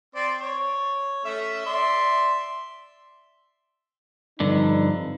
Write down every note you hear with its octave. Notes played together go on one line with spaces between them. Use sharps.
C4 C5 D5
C#5
A3 C#4 E5
D5 E5 C6
G2 D3 F3 C4 D#4